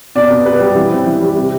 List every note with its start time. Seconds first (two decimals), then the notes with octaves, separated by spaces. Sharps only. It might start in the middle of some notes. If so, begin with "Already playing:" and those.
0.15 B2 D5
0.30 B3
0.46 B2 B4
0.60 G3
0.75 E3
0.91 C4
1.06 E3
1.21 G3
1.36 C3